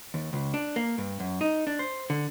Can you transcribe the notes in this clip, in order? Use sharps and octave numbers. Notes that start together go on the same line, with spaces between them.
D#2
C#2
D4
A#3
G2
F#2
D#4
D4
C5
D3